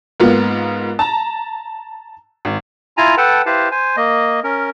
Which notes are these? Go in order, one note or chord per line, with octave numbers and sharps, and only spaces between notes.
G#2 A#3 B3 F4
A5 A#5
G#1
E4 F4 G#5 A#5
A4 B4 F#5 G5 A5
E4 G4 B4 C5 F5 A5
C5 G#5
A#3 D#5
C#4 A#4